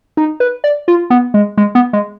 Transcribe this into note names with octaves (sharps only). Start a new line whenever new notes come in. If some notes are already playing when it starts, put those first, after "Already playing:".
D#4
B4
D5
F4
B3
G#3
G#3
B3
G#3